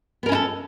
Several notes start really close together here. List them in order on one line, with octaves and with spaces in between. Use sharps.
B3 A#4 C#4 E4 A4